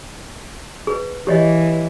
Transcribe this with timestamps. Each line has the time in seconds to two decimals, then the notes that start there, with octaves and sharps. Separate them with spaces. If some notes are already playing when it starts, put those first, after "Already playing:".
0.87 G#4 B4
1.27 E3 G4 C#5 D#5